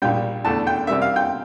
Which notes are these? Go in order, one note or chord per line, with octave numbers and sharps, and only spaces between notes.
A#1 A#2 G3 G5
E2 D3 A3 A5
G5
C3 G3 A#3 E5
F5
G5